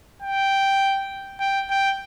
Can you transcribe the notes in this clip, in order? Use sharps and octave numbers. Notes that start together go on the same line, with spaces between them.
G5
G5
G5